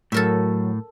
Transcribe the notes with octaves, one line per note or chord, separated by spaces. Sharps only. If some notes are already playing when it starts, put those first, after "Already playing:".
A2 F#3 A4 A#4 E5